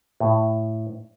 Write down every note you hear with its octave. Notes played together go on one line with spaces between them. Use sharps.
A2